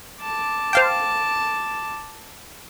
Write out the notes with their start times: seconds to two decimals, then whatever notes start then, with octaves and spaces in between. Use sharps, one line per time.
0.22 A5 D6
0.73 C5 F5 G5